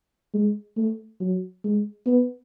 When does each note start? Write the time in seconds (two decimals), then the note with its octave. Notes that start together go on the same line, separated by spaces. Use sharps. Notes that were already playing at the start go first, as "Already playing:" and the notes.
0.34 G#3
0.77 A3
1.20 F#3
1.64 G#3
2.06 B3